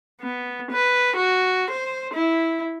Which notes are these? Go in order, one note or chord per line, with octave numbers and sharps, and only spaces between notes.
B3
B4
F#4
C5
E4